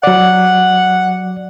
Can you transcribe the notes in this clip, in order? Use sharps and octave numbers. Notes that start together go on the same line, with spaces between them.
F#3 D5 F#5